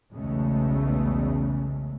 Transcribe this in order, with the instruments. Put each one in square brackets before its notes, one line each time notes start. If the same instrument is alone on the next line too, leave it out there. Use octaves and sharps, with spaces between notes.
[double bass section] B1 E2 C#3 G#3 A3